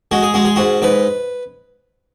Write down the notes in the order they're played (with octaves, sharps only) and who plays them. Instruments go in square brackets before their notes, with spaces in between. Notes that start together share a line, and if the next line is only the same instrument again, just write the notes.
[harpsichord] G#3 F#4
G#4
G#3 F#4
G#4
G#2 F#4
G#2 B4